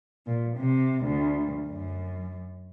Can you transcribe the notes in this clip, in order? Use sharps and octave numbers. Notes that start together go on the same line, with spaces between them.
A#2
C3
D2
F#2